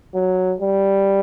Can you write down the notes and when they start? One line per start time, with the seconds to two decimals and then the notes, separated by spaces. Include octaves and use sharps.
0.14 F#3
0.60 G3